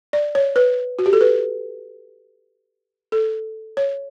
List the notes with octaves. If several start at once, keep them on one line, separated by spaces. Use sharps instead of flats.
D5
C#5
B4
F#4
G4
A4
B4
A4
C#5